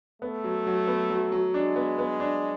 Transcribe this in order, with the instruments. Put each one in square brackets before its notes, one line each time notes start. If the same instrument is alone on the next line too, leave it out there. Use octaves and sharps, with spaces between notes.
[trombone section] A3 [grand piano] B3
[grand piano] F#3
F#3
B3
F#3
F#3
[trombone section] G#3 [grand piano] D4
[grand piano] B3
B3
D4